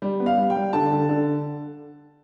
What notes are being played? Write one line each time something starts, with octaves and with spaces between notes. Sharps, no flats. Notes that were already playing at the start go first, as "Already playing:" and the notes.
G3
B3
F5
G3
G5
G3
D3 A5
D3
D3